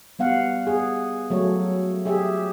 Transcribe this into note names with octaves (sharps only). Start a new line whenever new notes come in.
G3 B3 F5 F#5
G#4
F#3 A3 C#5
G4 G#4 E5